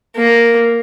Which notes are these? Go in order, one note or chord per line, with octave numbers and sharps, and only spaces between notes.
A#3